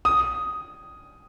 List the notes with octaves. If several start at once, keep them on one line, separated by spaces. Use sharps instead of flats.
D#6